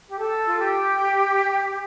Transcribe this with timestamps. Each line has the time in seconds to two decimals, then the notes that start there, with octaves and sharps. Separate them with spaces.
0.08 G4
0.19 A4
0.47 F4
0.59 G4